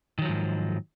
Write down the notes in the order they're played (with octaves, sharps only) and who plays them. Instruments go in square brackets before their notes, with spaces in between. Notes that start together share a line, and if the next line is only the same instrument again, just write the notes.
[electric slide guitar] D#3
F#3
F3
G#2